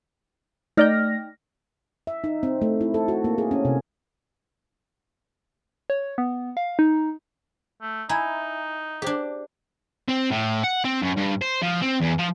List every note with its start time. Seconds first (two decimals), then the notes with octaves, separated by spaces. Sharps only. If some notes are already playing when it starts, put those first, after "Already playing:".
0.77 A3 D#4 D5 G5 F6 A#6
2.07 E5
2.24 D#4
2.43 C4
2.62 A3
2.81 E4
2.94 A4
3.08 F#4
3.24 A#3
3.38 G#4
3.51 C#4
3.65 C3
5.90 C#5
6.18 B3
6.57 F5
6.79 D#4
7.82 A3
8.09 D#4 E4 G#5 A#5
9.02 D4 G4 G#4 C5
10.08 C4
10.31 A2
10.64 F#5
10.85 C4
11.02 F#2
11.17 G2
11.42 C5
11.62 F3
11.81 C4
12.00 E2
12.18 F3